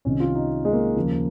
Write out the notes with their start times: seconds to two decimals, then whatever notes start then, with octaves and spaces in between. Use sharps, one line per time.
0.05 C2 C3 D#3 C#4
0.20 F4
0.35 D#4
0.65 G#3
0.73 A#3
0.96 D#2 C#3 F3